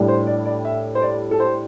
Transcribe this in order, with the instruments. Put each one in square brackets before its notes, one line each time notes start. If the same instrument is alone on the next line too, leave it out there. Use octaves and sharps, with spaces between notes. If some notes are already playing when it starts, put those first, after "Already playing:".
Already playing: [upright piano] A2 G3 D4
[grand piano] C5
D5
D5
E5
C5
D5
A4
C5